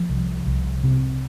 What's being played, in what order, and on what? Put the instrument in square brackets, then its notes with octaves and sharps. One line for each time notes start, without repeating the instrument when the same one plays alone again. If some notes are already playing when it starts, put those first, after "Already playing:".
Already playing: [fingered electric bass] F3
C2
C2
C3